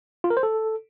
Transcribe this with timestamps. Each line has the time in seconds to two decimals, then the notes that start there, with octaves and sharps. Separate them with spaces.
0.24 F4
0.30 A#4
0.37 C5
0.43 A4